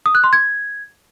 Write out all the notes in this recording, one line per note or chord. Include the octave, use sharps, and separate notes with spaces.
D#6
F#6
C6
G#6